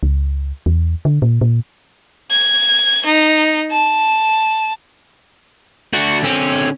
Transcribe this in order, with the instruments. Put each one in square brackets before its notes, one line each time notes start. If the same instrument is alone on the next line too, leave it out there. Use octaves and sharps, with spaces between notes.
[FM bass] C#2
E2
D3
A#2
A#2
[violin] G#6
D#4
A5
[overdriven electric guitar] A3 D4 [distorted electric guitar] F#4
[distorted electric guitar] D3 C4 [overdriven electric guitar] C#4